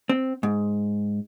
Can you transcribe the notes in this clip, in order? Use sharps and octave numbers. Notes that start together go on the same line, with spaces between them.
C4
G#2